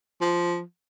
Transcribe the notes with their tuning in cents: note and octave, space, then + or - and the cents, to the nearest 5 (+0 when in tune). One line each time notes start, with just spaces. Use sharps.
F3 -5